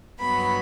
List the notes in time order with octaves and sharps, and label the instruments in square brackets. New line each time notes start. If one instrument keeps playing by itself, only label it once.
[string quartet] G2 F#3 B3 B5